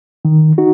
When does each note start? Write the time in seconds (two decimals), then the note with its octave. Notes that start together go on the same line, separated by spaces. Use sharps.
0.25 D#3
0.58 D#4 F#4